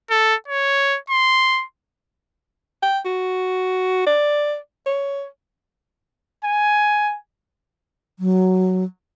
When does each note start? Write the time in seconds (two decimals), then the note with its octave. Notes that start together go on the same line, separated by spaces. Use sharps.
0.10 A4
0.48 C#5
1.10 C6
2.83 G5
3.05 F#4
4.06 D5
4.86 C#5
6.44 G#5
8.19 F#3